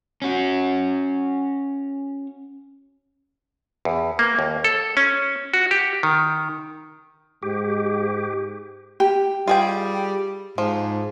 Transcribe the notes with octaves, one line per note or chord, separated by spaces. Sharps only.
C#4 F#4
E2
A#3
D#2
A4
C#4
F#4
G4
D#3
G#2 G4
G4
G3 F4 G#4 G5
G#2 F3